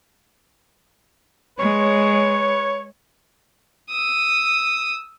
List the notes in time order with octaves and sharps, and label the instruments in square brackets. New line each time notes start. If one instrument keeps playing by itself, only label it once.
[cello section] G#3 [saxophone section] B4 C#5
[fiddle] D#6 E6